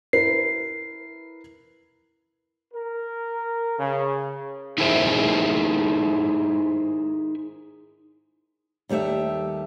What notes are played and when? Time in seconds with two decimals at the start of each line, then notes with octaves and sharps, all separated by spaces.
0.13 E4 A#4 B4 C7
2.74 A#4
3.79 C#3
4.78 D#4 E4 G#4 A#4 C5 E5
8.89 D#2 G3 A3 G4 E5